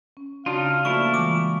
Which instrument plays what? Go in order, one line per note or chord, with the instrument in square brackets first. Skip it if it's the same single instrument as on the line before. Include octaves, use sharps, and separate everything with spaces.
[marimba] C#4
[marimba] C#3 F#4 [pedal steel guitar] D4 D#4 F4 [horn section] F5
[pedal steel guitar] F3 A3 E4 [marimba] A#3 F#4 D5 [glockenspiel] C#6
[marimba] E3 G3 G#3 [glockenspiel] D6